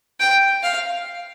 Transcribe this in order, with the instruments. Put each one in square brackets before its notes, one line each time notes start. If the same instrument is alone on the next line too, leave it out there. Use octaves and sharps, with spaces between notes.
[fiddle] G5
F5